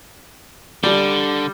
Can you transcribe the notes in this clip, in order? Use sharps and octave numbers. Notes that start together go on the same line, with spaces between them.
D3 G3